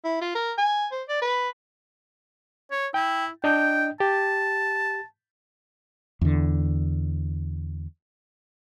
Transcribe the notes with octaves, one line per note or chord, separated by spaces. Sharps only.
E4
F4
A#4
G#5
C5
D5
B4
C#5
E4 G5
D4 D#5 G5 G6
G4 A5
E2 D3